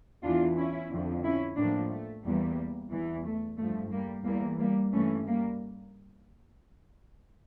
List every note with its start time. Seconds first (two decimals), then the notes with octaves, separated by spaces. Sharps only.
0.23 E2 E3 D4 F4
0.57 C#4 E4
0.91 F2 D3 F3
1.24 C#4 E4
1.57 A2 F3 A#3 D4
1.91 A3
2.25 E2 E3 G3 A#3
2.92 E2 E3
3.26 A3
3.59 G2 F3 A3
3.92 G3 A#3
4.26 E2 E3 G3 A#3
4.60 G3 A#3
4.92 G2 E3 A3 C#4
5.26 G3 A#3